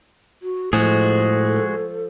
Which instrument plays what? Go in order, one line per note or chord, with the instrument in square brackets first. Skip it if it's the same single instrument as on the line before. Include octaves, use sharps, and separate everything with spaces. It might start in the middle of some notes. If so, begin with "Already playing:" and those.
[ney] F#4
[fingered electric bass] A2 [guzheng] F3 [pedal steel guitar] G#3 F#4 G#4 [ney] A4